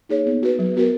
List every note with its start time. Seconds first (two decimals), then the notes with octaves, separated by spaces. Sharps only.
0.09 A#3 D#4 G#4 C#5
0.26 B3
0.43 F#4 B4
0.59 F#3
0.76 B3 F#4 A#4